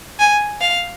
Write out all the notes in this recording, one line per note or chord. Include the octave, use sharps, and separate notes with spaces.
G#5
F5